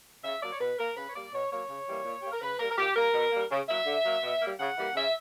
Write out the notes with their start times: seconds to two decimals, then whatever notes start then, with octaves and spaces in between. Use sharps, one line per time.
0.24 C#3 E5
0.42 F#3 A#3 D5
0.53 C#5
0.60 B2 B4
0.78 A#3 A#4
0.97 C#3 B4
1.07 C#5
1.15 G3 A#3 D5
1.33 B2 C#5
1.51 F#3 A#3 C#5
1.69 C#3
1.87 E3 G3 A#3
2.05 A#2
2.22 A#3 G4
2.31 A#4
2.42 C#3 B4
2.59 G3 A#3 A#4
2.70 A#4
2.78 A#2 G4
2.96 G3 A#3 A#4
3.14 B2
3.32 G3 A#3
3.50 C#3
3.68 F#3 A#3 E5
3.86 D3
4.04 F#3 A#3
4.23 B2
4.40 G3 A#3
4.59 C#3 F#5
4.77 E3 G3 A#3
4.95 C#3 E5